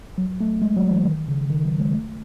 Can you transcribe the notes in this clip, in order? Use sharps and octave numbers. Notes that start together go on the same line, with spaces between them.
F#3
A3
G#3
F#3
E3
D#3
C#3
D#3
F#3
G#3
A3